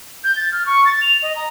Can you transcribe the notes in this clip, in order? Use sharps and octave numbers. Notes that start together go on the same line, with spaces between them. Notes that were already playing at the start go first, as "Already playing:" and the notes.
G6
A6
F6
C#6
A6
F7
D#5
A#5